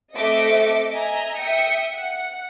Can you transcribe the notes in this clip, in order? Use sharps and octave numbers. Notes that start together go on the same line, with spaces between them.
A3 C4 D#5 E5 D6 C#7
D#5 E5 G#5 A#5
E5 G5 D#6 C#7
F#5